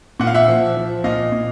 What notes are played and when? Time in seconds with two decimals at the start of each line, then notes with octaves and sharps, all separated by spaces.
0.20 A#2 F#5
0.27 F5
0.35 E5 F#5
0.48 F3
0.77 F3
1.04 A#2 D#5 F5
1.32 A#2